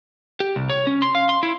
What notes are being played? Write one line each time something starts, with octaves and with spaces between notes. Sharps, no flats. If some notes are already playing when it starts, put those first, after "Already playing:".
G4
C2
C#5
C#4
C6
F5
C6
E4